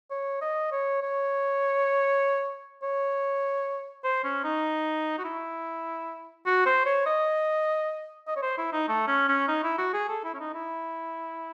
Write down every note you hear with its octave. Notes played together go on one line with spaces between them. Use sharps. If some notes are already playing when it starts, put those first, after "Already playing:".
C#5
D#5
C#5
C#5
C#5
C5
C#4
D#4
F#4
E4
F#4
C5
C#5
D#5
D#5
C#5
C5
E4
D#4
A3
C#4
C#4
D#4
E4
F#4
G#4
A4
E4
C#4
D#4
E4